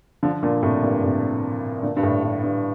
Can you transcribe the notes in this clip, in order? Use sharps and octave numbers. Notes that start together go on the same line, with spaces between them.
D3 F3
A#2 D3
A2 C3
G2 A#2
A2 C3
A#2 D3
G2
A2
G2
G2